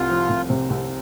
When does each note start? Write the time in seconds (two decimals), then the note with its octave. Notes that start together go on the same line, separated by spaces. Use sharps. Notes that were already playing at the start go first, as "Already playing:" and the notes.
Already playing: C2 C3 F4
0.09 F3
0.29 C2
0.50 C3
0.70 C2